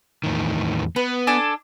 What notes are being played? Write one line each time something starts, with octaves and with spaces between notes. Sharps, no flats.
E2 A2 D#3
B3 B4
D4 A4 G#5